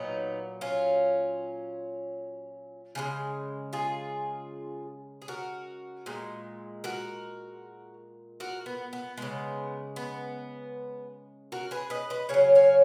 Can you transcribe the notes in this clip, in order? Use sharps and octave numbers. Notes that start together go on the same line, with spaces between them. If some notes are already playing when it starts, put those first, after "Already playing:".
Already playing: A#2 F#3 B3 D#4
C#4 F4
C#3 F3 G#3
F4 G#4
G#4
F#4 A#4
A#2 G#3
F#4 A#4
F#4 A#4
B3
B3
C#3 G#3 B3
B3
F#4 A#4
G#4 B4
B4 D#5
B4 D#5
C#3 F#3 C#5 F5
C#5 F5